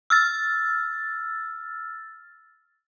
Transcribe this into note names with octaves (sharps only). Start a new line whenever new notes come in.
E6 F6 A6